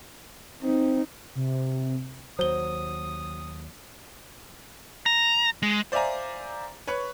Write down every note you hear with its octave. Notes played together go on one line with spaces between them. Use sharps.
C4 D#4
C3
D#2 F#3 C5 D#6 G7
A#5
G#3
C5 D5 E5 F5 G#5 A#5
B4 C#5 C#6 F#6